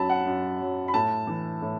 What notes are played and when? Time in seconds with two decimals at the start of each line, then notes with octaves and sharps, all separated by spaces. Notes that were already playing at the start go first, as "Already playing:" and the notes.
Already playing: F#2 F#3 A5 B5
0.10 F#5
0.26 F#2
0.60 F#3
0.88 B5
0.94 A2 A5
1.27 E3
1.62 A2